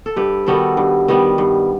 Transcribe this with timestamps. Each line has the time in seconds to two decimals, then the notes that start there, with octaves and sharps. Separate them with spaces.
0.06 A4
0.16 G2 G4 B4
0.47 D#3 G3 B3 F#4 A4
0.77 G2
1.08 D#3 G3 B3
1.38 G2